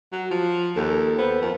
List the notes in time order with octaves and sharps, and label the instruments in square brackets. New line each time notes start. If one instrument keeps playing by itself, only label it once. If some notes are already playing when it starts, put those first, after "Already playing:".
[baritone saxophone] F#3
F3
[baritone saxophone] D#2 [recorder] A4
[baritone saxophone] B3 [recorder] C5
[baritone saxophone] F2 [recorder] A#4